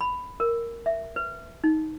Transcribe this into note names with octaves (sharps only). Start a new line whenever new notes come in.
B5
A#4
E5
B4
D#4